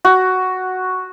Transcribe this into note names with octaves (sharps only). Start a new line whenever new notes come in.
F#4